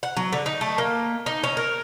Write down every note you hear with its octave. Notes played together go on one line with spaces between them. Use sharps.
F#5
F#3
D3
D#4
A3
A#3
D#4
C#4
A#4